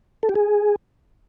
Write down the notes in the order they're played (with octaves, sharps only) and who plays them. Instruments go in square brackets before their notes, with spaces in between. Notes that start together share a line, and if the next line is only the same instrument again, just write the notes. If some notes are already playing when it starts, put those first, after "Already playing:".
[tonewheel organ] A4
G4
G#4